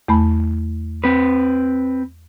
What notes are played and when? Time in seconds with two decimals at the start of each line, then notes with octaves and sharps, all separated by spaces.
0.08 E2 A3 B5
1.04 C4 B4